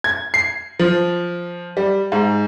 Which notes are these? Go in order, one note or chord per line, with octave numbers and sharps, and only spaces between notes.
G#6
C7
F3
G3
G#2